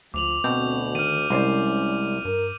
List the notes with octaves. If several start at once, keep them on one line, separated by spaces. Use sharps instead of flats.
D2 F3 D6 F7 F#7
D2 B2 C4 G6
D#3 F6 D#7
C2 G#3 C#4 C5 D5
G2 A#4